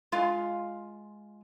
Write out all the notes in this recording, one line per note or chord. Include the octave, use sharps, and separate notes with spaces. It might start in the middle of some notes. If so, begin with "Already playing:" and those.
G#3 F4 F5